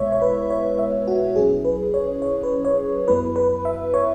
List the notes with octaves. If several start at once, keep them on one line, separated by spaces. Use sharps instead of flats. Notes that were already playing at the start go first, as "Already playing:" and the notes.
Already playing: B1 B2 G#3 B3 E4 C#5 E5
C#5
B4
C#5
E5
F#4
B1 B2 F#3 C#4 E4 G#4
B4
C#5
C#5
B4
C#5
F#2 F#3 B3 E4 B4
B4
E5
C#5